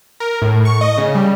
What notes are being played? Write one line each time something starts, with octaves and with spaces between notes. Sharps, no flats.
A#4
A2
C#6
D#5
C#3
G3